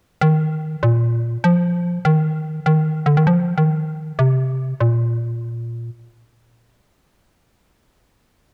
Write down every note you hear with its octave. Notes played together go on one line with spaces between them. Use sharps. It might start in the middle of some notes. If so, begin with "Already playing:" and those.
D#3
A#2
F3
D#3
D#3
D3
D#3
F3
D#3
C3
A#2